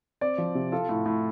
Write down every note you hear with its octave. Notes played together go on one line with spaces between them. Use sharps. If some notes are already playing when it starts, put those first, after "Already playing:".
C4 D5
F3
C3
F4 A4
A2
A2